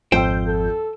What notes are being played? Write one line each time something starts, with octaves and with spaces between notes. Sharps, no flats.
G#1 F2 F4 C5 G5 E6 G6
A4